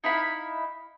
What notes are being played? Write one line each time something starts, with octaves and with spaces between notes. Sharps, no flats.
D#4 E4 F5 B5